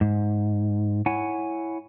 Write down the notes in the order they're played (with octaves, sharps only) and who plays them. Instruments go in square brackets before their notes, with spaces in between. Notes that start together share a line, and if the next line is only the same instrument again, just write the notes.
[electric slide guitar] G#2
E4 C#5 F#5 G#5